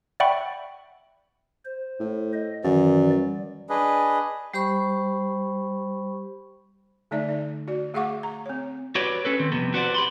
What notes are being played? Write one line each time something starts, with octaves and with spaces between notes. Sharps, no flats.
D5 E5 F#5 G5 B5 C#6
C5
A2
D#5
F#2 D#3 E3 D5
G3
D4 G#4 B4 D#5
G3 G4 C5 B5 C#6
D3 A3 D#4 D5 E5
D5
F#4 D5
A3 G#4 F5 F#5 C#6 D6
A#5
C4 C#5
F#4 G4 B4 C#5 D5
C#4 A4 B4
D#3 C4
C2 F2 C3 B3
F#4 B4 C5 D5 F#5
G4 B5 C6